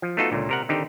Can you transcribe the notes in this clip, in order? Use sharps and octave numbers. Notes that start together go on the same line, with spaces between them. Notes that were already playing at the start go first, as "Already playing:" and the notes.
F3
A3 B3 D#4 F4 F#4 A4
C#2 A#2 D3
C3 A#4 F#5
D3 D#3 C4 D#4 G4